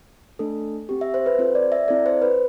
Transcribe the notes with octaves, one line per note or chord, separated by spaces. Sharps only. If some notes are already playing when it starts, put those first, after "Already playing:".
A3 D4 A4
C4 G4
E5
C5
B4
C4 F4 A4 C5
D5
E5
C4 E4 A4 D5
C5
B4